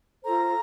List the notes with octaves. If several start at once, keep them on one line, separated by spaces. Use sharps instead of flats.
F4 A4 C5 A#5